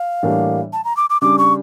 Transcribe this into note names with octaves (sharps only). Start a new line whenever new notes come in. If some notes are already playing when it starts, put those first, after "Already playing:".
Already playing: F5
A2 E3 G3 A#3 D4
A5
A#5
D6
D6
C#3 G3 D4 D6
C#6